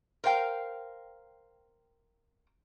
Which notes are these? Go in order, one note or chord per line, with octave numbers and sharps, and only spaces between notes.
A#4 C5 F5 G5